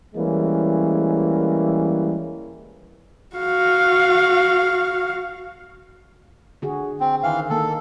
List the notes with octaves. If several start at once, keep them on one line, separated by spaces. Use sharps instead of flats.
E3 G3 G#3 A#3 C#4
F#4 F5
D3 F#4 G#4
C4
D#3 E3 F5
D#3 A#3 A4